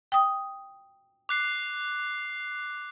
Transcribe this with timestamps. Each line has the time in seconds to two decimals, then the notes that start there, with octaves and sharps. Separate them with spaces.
0.12 G5 D#6
1.29 D6 F#6 C7